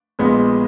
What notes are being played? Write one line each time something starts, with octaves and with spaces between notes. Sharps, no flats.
A#1 A#2 G#3 B3